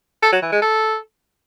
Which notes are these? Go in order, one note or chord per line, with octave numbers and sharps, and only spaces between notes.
A4
F#3
E3
G#3
A4